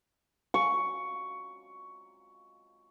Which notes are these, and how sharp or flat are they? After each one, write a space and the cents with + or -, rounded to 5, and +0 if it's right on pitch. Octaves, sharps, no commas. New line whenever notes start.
C#6 +10